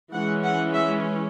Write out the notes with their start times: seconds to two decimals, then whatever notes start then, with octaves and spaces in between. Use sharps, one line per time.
0.13 E3 G#3 C#4 F#5
0.44 F#5
0.73 E5